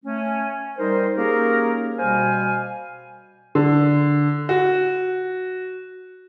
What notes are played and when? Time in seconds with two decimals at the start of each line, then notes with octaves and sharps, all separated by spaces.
0.05 A3 C#4
0.78 G3 D#4 A#4 C5
1.16 A#3 C#4 D#4 G4 G#4 A#4
1.98 B2 G3 C5 F5 G#5
3.55 D3
4.49 F#4